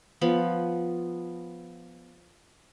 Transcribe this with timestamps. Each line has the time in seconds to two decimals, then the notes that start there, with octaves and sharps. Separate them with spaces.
0.21 F3 B3 B5